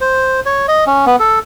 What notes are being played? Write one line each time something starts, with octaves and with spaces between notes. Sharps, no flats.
C5
C#5
D#5
C#4
B3
A4